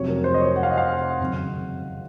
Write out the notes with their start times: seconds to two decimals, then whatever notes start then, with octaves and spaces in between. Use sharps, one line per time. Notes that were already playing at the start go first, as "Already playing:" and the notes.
Already playing: F1 F2 C3 F#3 C#5
0.08 A#4
0.24 C5
0.34 D#5
0.40 C#5
0.56 F#5
0.63 F5
0.71 D#5
0.78 F5
0.88 F#5
1.20 G#1 F#2 C#3